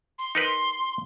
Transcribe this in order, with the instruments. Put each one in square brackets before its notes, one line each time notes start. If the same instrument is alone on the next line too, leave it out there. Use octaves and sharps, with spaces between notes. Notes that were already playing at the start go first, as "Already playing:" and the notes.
[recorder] C6
[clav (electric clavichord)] D#4 A#4 B4